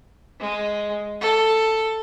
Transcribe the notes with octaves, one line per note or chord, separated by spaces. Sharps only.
G#3
A4